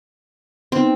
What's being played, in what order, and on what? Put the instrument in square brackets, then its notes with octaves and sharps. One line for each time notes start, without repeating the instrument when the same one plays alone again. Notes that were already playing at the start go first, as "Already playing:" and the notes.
[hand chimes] B3 D#4 [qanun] C4